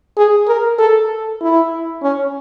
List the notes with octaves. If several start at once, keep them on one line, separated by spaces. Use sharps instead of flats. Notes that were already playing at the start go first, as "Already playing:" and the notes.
G#4
A#4
A4
E4
C#4